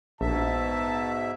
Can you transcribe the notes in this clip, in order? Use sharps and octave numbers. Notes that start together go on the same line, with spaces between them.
A#1 G#2 B2 E5 A5